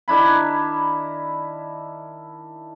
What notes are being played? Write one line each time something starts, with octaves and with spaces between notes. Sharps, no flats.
D#3 D4 E4 B5